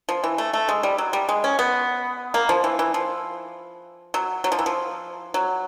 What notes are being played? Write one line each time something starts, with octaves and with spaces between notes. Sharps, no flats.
F3
E3
A3
A3
G#3
G3
F#3
G3
G#3
C#4
B3
A#3
F3
E3
E3
F3
F#3
F#3
F3
E3
F3
F#3